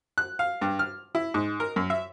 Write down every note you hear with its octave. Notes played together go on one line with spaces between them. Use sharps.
F#6
F5
G2
F6
E4
G#2
A#4
F#2
E5